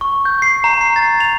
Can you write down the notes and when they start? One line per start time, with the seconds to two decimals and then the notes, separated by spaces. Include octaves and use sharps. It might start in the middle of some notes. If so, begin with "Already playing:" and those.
0.01 C#6
0.25 G6
0.42 C7
0.64 A#5
0.81 C7
0.96 A6
1.20 F7